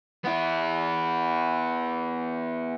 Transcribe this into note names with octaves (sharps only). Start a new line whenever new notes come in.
B3 E4